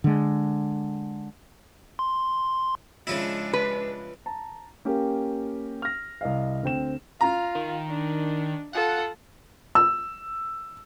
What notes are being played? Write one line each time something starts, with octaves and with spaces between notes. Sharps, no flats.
D3 G#3
C6
C#3 F3 G#3 D4 E4
B4
A5 A#5
A#3 C#4 G4 A#4
F6 A#6
C2 D#5 F5
D2 C4 G5 E7
F4 A#5
D#3
D4
F4 A4 F#5
E6